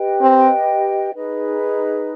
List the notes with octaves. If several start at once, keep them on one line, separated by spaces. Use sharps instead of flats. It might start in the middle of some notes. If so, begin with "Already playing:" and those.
Already playing: G4 B4 D#5 G5
C4
D#4 G#4 B4 D#5